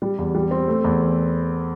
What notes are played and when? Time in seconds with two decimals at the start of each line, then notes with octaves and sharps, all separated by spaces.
0.02 G3
0.18 E2
0.35 G3
0.51 C4
0.68 A3
0.84 E2